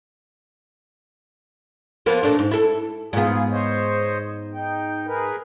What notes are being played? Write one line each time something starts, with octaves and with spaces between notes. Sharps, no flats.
F3 A#3 B3
A#2 A3 D4
G#2
E4 A4
G#2 B3 F4 G#4
C5 C#5 D#5
D#4 G5
G#4 A#4 B4